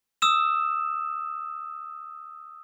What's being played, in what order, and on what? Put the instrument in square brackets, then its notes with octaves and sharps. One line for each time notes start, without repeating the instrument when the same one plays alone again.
[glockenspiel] D#6 E6 E7